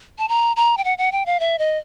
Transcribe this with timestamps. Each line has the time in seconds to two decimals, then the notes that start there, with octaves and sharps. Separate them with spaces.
0.18 A5
0.29 A#5
0.56 A#5
0.77 G5
0.84 F#5
0.98 F#5
1.12 G5
1.26 F5
1.40 E5
1.59 D#5